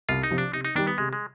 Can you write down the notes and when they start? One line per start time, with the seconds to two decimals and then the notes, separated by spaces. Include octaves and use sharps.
0.09 C2 F4
0.23 D#4
0.30 C3 F3
0.38 D4
0.53 C3 D#4
0.65 D#4
0.75 D#3 G3 D4
0.87 B3
0.98 C3 G#3
1.13 G#3